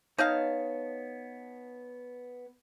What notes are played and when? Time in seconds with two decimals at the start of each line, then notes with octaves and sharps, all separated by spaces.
0.18 B3 D#4 C#5 D#5 F5 A5